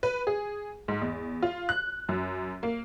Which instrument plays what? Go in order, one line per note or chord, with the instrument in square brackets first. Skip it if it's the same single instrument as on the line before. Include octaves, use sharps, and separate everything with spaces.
[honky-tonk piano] B4
G#4
G#2
E2
F4
F#6
F#2
A#3